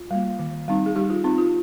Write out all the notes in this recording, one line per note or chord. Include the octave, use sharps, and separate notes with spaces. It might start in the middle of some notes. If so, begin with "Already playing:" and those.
Already playing: F4
G3 A#3
D#3
G3 C4 D#4
G#4
G3 D#4 G4
F4
C4 D#4
F4